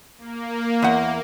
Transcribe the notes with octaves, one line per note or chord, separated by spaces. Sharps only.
A#3
E2 F#5